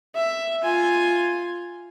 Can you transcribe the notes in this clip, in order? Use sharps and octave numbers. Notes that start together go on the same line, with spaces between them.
E5
F4 G#5